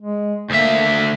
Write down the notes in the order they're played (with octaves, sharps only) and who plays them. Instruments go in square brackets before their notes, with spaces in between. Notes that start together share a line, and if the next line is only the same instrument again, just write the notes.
[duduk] G#3
[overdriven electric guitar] D2 E5 [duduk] A#3